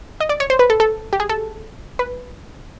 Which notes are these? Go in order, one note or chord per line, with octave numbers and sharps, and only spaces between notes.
D#5
D5
C#5
C5
B4
A4
A4
G4
G#4
A4
B4